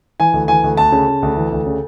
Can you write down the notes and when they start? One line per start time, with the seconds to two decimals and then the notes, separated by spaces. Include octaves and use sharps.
0.20 E3 G#5
0.33 D2
0.48 E3 G#5
0.64 D2
0.77 D2 A5
0.92 C#3
1.07 C#3
1.22 D2
1.37 E3
1.52 D2
1.66 C#3